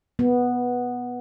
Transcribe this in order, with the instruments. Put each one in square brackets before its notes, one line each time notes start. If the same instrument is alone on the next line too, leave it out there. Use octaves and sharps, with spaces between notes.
[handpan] B3